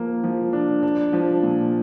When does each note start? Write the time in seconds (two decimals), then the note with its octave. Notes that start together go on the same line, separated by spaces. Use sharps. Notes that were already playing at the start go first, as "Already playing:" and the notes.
Already playing: F3 A#3
0.24 F3
0.53 D4
0.83 D4
1.13 F3
1.43 A#2